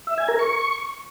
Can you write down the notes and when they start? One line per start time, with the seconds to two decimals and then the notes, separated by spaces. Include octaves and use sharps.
0.07 E5
0.18 G#5
0.28 A#4
0.39 C#6